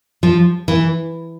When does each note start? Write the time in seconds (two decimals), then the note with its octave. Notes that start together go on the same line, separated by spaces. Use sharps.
0.23 F3
0.68 E3